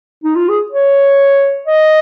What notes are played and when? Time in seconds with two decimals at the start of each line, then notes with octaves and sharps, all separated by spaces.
0.24 D#4
0.35 F4
0.48 G#4
0.72 C#5
1.67 D#5